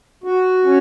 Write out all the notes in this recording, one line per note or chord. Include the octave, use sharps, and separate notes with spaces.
F#4
C#4